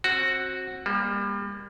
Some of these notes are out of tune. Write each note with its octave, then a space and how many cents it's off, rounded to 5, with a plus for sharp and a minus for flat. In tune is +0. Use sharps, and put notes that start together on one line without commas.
C4 +30 F#4 +0
G3 +35 A#3 +25